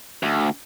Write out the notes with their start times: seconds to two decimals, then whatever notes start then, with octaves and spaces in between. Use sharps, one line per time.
0.23 D2